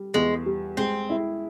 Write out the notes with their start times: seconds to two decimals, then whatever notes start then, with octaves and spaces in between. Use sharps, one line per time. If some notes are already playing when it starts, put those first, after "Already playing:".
Already playing: G3
0.14 E2 G#3
0.46 G3
0.77 G#3 C4
1.09 E4